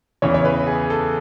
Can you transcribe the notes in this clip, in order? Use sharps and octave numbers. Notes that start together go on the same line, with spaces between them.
E2 C#3 E3 C#5
C#5
B4
G#4
A4